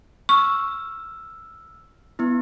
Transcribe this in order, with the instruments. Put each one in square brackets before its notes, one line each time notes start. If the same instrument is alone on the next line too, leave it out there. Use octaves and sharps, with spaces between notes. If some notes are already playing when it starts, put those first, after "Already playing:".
[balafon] C#6 [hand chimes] E6 F6
[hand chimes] B3 E4